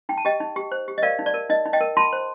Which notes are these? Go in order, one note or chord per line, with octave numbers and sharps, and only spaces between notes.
D#4 G5
A5
G4 D#5 G5
D#4
G4
C5
G4
D#5
A#4 D5 F5
D#4
D5
A#4
D#4 D#5
D#4
D#5 G5
A#4
F4 A5 C6
C5